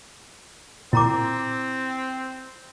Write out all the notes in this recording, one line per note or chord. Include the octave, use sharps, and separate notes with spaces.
A#2 C4 E4 A#5 D6